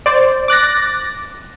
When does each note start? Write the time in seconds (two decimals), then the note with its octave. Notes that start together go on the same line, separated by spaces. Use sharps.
0.06 C5 D5
0.48 D6 F#6 A6 A#6